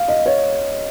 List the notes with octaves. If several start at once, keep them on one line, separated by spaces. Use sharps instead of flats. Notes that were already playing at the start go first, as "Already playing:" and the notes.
Already playing: F5
D#5
C#5